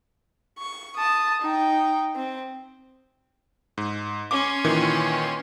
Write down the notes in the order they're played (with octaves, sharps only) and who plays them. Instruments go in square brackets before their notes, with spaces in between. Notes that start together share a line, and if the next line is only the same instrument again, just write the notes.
[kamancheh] C#6
A5 D#6
D#4 G5
C4
[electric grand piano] G#2
[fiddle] C#4 C6 [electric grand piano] D6
[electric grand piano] A#2 D#3 E3